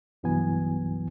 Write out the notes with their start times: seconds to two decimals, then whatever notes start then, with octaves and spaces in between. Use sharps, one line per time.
0.23 C2 G2 E3 F#3 B3 G#5